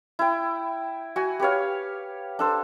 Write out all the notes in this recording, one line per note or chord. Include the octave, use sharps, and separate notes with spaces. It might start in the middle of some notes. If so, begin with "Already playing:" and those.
E4 G5
F#4 G#5
G4 B4 C#5 F5
D4 A4 C5